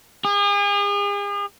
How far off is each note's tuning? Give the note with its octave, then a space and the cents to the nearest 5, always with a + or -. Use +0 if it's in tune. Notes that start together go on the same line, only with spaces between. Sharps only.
G#4 -40